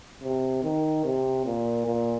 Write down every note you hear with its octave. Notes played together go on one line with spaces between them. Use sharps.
C3
D#3
C3
A#2
A#2